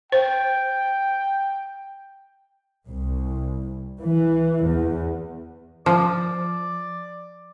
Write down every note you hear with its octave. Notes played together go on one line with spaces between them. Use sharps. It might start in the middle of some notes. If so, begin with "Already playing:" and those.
C5 G5
C2
E3
E2
F3 D5